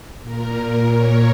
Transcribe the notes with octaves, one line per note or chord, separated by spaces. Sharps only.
A#2 A#4
C#5